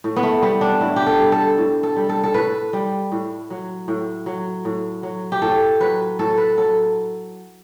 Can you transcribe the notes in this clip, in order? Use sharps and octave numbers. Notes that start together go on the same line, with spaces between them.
A2
B3
A3
G3 B3
D4
A2 E4
G4
A4
G3
A4
A2
A4
G3
A4
A4
A2 B4
G3
A2
F#3
A2
F#3
A2
F#3
G4
A2 A4
F#3 B4
A2 A4
B4
F#3 A4